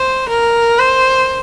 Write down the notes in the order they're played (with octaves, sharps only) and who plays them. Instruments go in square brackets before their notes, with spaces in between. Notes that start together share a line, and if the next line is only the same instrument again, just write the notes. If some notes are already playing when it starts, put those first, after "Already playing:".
Already playing: [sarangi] C5
A#4
C5